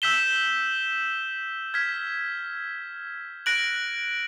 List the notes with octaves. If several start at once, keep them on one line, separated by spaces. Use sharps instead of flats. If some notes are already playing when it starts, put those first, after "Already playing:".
E6 G6 B6 E7 G7
F6 G#6 B6
F#6 A#6 D7 F#7